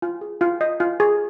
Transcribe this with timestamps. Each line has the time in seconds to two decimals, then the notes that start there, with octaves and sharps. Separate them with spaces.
0.02 F4
0.21 G#4
0.41 F4
0.61 D#5
0.80 F4
1.00 G#4